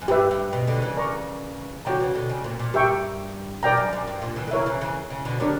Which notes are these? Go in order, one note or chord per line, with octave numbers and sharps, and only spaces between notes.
F#2
G2 G4 B4 E5
G2
B2
B2 D3
C#3 E3
A#4 D5 A#5 C#6
D3 F#3 F#4 C#5 G5 A#5
C#3 E3
B2 D3
C#3
A#2
A#2
G2 G4 A#4 E5 G5 C#6
B2 A#4 D5 G5 A#5
F#2
F#2
G2
A#2
C#3 E3
D3
C#3 E3 E4 A#4 C#5 E5
C#3 E3
C#3 E3
C#3
B2 D3
D3 F#3 D4 G4 A#4 C#5